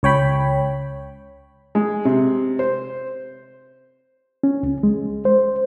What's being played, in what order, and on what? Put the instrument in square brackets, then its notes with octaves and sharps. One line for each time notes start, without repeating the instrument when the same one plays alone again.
[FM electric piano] C#2 C#5 G5 B5
[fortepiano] G#3
C3
C5
[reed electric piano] C#4
C#2
G#3
C5